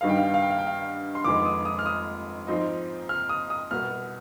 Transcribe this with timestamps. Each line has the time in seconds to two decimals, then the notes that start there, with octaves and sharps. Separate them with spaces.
0.01 G2 D#3 G3 B3 D#4 F5
0.09 G5
0.18 F5
0.26 G5
0.34 F5
0.42 G5
0.50 F5
0.58 G5
0.67 F5
1.15 C6
1.24 F1 F2 D#3 G#3 B3 D6
1.45 D#6
1.65 D#6
1.79 F6
1.86 D#6
2.47 G#2 F3 C4 D#4
3.09 F6
3.29 D#6
3.50 D#6
3.71 C2 B2 B3 F6